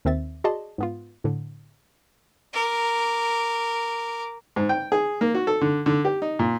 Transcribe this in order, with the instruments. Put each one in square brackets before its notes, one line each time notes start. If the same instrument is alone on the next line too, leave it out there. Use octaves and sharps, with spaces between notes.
[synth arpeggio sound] D#2 D#3 C4 E5 A6
F#4 G#4 D5 D#5 A5 C6
G#2 B3 F4
A2 D3
[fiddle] A#4 D6
[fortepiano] G#2
G5
G#4
A#3
F#4
A4
D3
D3
G4
D#4
A#2